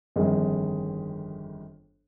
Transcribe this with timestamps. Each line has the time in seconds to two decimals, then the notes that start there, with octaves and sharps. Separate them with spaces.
0.16 G1 F2 D#3 G#3